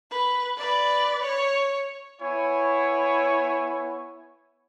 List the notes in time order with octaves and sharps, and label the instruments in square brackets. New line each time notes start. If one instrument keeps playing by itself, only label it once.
[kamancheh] B4
B4 D5
C#5
[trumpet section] B3 E4 C#5 G#5